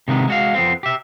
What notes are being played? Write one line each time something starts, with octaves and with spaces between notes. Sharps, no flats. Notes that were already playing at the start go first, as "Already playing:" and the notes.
C3 D#3 G#3 B3
G#3 F#4 F5
F2 B3 C4
G4 E5